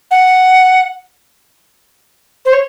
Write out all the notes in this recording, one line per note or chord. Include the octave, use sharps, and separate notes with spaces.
F#5
C5
C#5